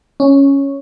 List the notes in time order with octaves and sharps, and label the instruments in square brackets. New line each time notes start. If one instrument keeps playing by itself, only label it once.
[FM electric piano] C#4